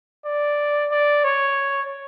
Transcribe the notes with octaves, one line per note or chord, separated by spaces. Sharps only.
D5
D5
C#5